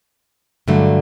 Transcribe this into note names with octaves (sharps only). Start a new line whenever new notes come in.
G2 D3 F#3 A3